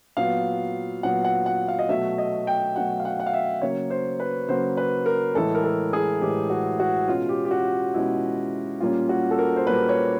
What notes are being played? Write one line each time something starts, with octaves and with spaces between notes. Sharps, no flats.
A#2 F#3 B3 F5
A#2 F#3 B3 F#5
F#5
F#5
F5
D#5
B2 F#3 A3 E5
D#5
G5
B2 F#3 A3 F#5
F5
F#5
F#5
F5
E5
C#3 F#3 A#3 C#5
C5
B4
C#3 F#3 A#3 C5
B4
A#4
A2 E3 G#3 A4
A#4
A4
G#4
A2 E3 G#3 G4
F#4
F#4
B2 G#3 C#4 F4
G4
G4
F#4
B2 G#3 C#4 E4
A#2 G3 A#3 C#4 F4
F#4
A4
A#4
C5
A#2 G3 A#3 C#4 B4
C#5